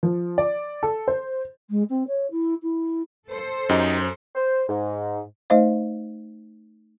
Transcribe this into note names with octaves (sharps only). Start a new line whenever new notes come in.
F3
D5
A4
C5
G#3
C4
C#5
E4
E4
A4 C5
F#2 D#4 G4
C5
G#2
A3 D#4 C5 D#5 F5